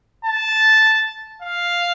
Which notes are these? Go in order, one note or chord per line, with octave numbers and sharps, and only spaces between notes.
A5
F5